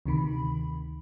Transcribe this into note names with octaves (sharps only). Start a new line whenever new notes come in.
D2 C3 D#3 B5